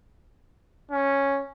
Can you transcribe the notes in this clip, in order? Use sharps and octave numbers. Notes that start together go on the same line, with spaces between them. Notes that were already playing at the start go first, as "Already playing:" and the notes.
C#4